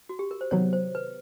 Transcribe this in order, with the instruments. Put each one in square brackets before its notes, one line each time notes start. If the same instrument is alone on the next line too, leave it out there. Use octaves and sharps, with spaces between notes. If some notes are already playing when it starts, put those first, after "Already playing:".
[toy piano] F#4
G4
A#4
C5
[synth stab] C3 D#3 F#3 B3 [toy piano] C#5
[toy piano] C5
B4